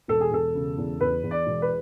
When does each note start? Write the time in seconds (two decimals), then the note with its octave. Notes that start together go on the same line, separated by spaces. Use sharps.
0.08 E1 A4
0.21 G#4
0.31 E1 A4
0.55 C#3
0.78 E2
1.01 E2 B4
1.23 E2
1.31 D5
1.46 E1
1.62 B4